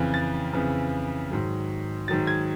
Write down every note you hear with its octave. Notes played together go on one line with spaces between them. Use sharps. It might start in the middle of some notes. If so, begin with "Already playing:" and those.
Already playing: F2 C#3 E3
A6
F2 C#3 E3
G#2 D#3 F#3
G#2 D#3 F#3 A6
G#6